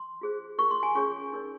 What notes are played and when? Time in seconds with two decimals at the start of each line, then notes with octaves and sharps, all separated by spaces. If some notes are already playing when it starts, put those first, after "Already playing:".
Already playing: C6
0.21 F4 G#4 C5
0.58 F4 A#4 C#5 C#6
0.71 C6
0.83 G#5
0.95 C#4 F4 G#4 C#5 C#6
1.32 D#4 A#4 C#5